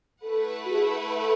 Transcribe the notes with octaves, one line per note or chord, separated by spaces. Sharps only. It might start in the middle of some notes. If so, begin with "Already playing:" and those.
A3 E4 A4 B4 F#5
F#4
G#4
A4